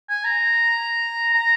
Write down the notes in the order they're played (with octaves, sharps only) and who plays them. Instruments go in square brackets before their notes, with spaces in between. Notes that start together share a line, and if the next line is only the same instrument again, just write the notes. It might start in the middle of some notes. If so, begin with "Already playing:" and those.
[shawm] G#5
A#5
A#5